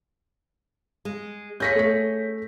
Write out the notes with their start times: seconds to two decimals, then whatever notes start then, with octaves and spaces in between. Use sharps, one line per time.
1.05 G#3
1.60 C#4 G#4 C#5 G6 A#6 B6
1.75 A3 B6